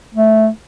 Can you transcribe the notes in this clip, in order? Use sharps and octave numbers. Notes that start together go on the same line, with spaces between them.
A3